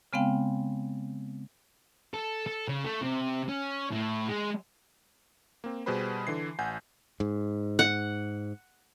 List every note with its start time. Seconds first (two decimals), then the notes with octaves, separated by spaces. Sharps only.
0.13 C#3 G#3 B3 C4 F5 G5
2.14 A4
2.47 A4
2.68 C#3
2.84 A3
3.01 C3
3.49 C#4
3.92 A2
4.29 G#3
5.64 A#3 C4
5.86 B2 G3 G#4 B4 C5 B5
6.27 D3 E3 C7
6.59 A1 F#5 G#5 G6
7.20 G#2
7.79 F#5